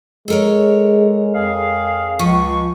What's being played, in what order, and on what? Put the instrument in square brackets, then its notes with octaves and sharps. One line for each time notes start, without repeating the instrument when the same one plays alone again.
[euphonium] G#3 [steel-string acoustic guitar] A4 A#4 C#5
[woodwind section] F2 G#4 F5
[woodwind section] C#2 C#6 [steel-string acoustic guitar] F3